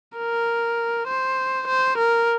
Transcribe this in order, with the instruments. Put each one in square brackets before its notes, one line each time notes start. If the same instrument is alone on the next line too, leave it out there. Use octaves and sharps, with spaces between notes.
[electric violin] A#4
C5
C5
A#4